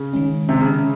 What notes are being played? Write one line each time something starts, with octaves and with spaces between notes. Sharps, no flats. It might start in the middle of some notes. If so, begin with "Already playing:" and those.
Already playing: C#3
D#3 G#3 C#4
C3
C#3
C#3